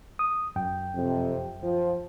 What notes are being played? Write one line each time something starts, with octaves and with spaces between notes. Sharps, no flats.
D#6
F#2 G5
F2 C3
F3